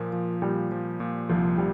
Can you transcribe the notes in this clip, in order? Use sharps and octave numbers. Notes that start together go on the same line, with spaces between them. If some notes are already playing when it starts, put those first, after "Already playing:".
Already playing: A#2 F3 A#3
F3
A#2 G3
F3
A#2
C2 F3
G3